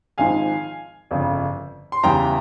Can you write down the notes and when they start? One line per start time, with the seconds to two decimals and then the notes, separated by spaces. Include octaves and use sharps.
0.18 G#1 G#2 F3 F5 G#5
1.11 G1 F2 C#3
1.92 C6
2.03 E2 C#3 E3 G3 G5 A#5